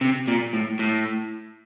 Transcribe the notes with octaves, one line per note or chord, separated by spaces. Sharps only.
C3
A#2
A2
A2